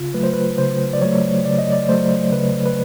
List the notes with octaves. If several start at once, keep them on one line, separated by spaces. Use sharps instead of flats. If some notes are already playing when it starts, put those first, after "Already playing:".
Already playing: C#3 F4
F#3 A3 B4
C5
B4
C#3 C5
D5
F#3 A3 C#5
C#3 D5
D#5
D5
F#3 A3 C5
C#3 B4
B4